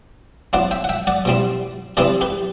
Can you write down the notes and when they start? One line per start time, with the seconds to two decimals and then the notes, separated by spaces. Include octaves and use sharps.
0.53 F#3 C4 E4 D5 F#5
0.71 E5 G5
0.84 F#5
0.89 E5 G5
1.07 D5 F#5
1.25 B2 G3 C4 E4
1.97 C3 E3 G3 C4 E4 B4 D5
2.21 G4 B4